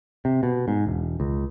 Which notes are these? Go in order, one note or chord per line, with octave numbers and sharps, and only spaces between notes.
C3
B2
G#2
E1
C#2